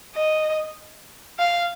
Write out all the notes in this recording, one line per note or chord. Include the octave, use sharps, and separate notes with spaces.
D#5
F5